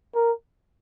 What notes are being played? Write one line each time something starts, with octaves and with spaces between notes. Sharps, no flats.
A#4